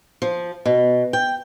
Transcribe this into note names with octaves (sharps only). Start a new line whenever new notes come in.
F3
B2
G5